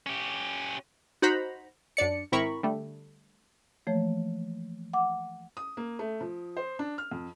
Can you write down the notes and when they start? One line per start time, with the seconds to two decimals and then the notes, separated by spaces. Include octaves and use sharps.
0.06 C#4 G4
1.22 D#4 F#4 C5 F#5 A#5 B5
1.97 F#2 D4 D5 C#7
2.32 G#1 C4 E4 A#4 B5 C#6
2.63 D3 G3 A3
3.87 E3 F3 A3 A#3 C#5
4.93 F#5 D6
5.57 D#6
5.77 A#3
5.99 A3
6.21 F3
6.57 C5
6.79 D4
6.98 F6
7.11 F2